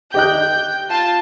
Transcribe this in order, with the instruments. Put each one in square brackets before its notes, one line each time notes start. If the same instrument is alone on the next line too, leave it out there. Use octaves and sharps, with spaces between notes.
[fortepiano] G4 D#5 F#6 [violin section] G5 G6
[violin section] F4 A5